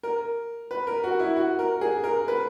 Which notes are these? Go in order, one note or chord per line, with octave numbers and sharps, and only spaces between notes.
A#4
B4
A#4
F#4
E4
F#4
A#4
G#4
A#4
B4